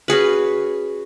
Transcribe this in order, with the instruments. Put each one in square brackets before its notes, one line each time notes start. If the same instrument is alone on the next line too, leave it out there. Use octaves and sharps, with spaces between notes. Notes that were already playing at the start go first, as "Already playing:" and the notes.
[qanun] C#4 F#4 G#4 B4